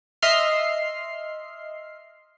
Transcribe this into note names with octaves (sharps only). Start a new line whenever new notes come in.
D#5 E5 C6 F6 C7